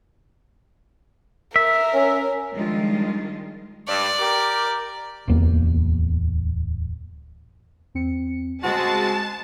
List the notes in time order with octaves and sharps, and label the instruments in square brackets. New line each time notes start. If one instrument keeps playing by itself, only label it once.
[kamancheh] A#4 [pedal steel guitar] E5
[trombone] C#4
[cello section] D#3 F3 G3 G#3 D4 F4
[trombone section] G2 [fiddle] D5
[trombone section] G4 A#4
[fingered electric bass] D1 E2 A#3
[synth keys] E2 C4 C#7
[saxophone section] C#3 C4 F#4 [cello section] G#3 [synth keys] F#5 [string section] A5